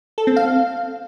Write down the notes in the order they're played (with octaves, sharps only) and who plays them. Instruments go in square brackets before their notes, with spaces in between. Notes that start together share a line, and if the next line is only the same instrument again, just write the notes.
[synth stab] A4
C4
F5